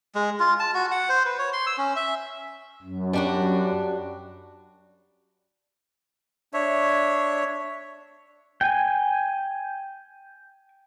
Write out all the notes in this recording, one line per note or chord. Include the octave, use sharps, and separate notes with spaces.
G#3
F4
A5
F#4
F#5
C5
B4
C#5
C6
E6
C#4
E5
F#2
G3 D4 F#4
D4 C#5 E5
G5 G#5